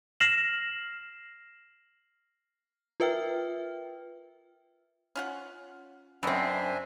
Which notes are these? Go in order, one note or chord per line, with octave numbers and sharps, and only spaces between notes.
F6 A#6 C7 E7 F#7
F4 A#4 B4 E5 G5 F6
C#4 F4 F#5
F#2 C4 D4 A#4 B4 D#5 E5 G#5